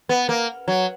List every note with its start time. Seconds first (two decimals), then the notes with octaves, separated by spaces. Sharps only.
0.09 B3
0.29 A#3
0.68 F#3